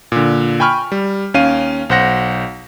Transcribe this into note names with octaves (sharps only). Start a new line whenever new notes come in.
A#2 D3
G5 G#5 B5 C#6 F6
G3
D#2 C#4 F5 D#7
B1 C5 F#5 A#6